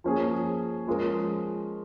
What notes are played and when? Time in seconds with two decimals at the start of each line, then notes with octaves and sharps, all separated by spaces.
0.04 F3 A#3 C#4 G#4
0.87 F3 G#3 C#4 F4 A#4